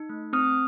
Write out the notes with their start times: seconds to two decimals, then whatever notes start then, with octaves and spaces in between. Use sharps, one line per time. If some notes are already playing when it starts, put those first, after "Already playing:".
Already playing: D#4
0.09 A3
0.33 C4 D#6 F6